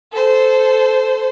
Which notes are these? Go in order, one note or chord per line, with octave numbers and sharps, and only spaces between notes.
A4 C5